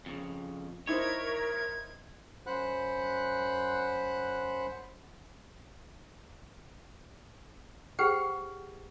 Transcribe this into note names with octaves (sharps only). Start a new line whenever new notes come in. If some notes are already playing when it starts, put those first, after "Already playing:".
F2 C#3
D#4 E4 A#4 C5 C#5 E5 G#6
F#2 C5 F#5 B5 F#6
G4 G#4 B4 C5 F#5 G5